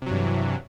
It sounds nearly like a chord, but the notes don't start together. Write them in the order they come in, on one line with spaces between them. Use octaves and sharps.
C3 F#3 G2 E3